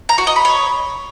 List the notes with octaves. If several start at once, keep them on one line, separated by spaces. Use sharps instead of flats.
A#5
F#4
D#5
B5
C#5